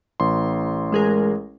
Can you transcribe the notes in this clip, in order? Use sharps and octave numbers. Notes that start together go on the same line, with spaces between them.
A1 C6
G#3 G#4 A#4